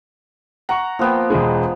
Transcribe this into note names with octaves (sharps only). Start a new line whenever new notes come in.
F#5 A#5 C#6
F3 A#3 B3 G5
E1 G#3